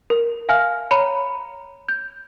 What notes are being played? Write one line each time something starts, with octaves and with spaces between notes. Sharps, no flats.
A#4
E5 F5 G#5 F6
C#5 A#5 B5 C#7
G6